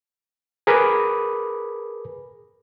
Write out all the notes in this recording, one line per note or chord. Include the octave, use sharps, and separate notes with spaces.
G#4 A#4 B4 B5 D6 D#6